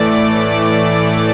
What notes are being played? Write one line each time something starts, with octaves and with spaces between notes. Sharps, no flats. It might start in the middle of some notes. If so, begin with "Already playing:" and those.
Already playing: A2 E3 A3 D5 D6
D5 D6